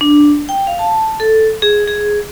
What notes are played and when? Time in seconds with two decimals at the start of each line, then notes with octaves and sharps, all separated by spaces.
0.01 D4
0.49 G5
0.67 F5
0.79 A5
1.20 A4
1.62 G#4
1.87 G#4